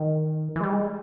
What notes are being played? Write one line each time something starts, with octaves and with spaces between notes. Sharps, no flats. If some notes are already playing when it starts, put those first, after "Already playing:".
Already playing: D#3
E3
G#3
G3
G#3